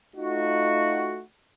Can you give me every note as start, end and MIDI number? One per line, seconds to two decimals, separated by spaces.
0.15 1.21 57
0.15 1.21 63
0.15 1.21 65
0.15 1.21 66